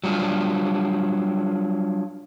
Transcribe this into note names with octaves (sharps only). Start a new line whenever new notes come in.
F#3 G3 D4 F4